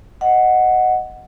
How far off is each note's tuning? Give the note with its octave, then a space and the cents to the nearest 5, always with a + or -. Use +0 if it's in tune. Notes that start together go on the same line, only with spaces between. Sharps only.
D#5 +0 F#5 +0